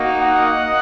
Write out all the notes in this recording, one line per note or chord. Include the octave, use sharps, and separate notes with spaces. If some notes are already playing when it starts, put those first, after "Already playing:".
Already playing: A#3 D#4 F#4
D#5 F#5